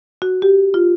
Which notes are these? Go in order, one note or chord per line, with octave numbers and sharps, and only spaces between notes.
F#4
G4
F4